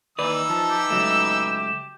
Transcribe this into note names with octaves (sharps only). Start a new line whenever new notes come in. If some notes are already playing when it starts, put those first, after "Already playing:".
D#2 E3 D#4 B4 D5 E6
F3 A5
G4
C#2 F#3 A3 E7